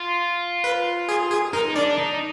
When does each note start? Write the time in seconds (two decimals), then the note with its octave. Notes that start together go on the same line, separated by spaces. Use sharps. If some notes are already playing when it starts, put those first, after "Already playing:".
Already playing: F4
0.64 B4
1.09 G#4
1.31 G#4
1.53 D#4 A#4
1.76 D4 D5
1.98 D#4